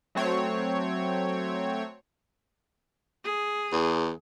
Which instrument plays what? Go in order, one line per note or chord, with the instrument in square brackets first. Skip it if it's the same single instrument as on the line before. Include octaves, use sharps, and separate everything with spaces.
[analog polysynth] F#3 A3 C4 C#5
[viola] G#4
[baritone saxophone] E2